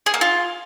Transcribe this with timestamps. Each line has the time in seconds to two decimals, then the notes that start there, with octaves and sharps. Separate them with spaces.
0.06 G#4
0.14 A#3
0.21 F4